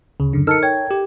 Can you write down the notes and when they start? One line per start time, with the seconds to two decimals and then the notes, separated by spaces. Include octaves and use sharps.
0.20 D2 C#3
0.33 F#2 D3
0.47 D#4 A4 A#4 A5 E6 F6 C#7
0.63 C#5 G5 G#6
0.91 G4